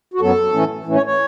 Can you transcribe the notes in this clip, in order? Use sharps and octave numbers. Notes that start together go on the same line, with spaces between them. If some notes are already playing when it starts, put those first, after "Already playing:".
F#4
F#2 F#3 B3 A4
A2 E3 A3 C#4
A2 E3 A3 C#4
C#5
C#5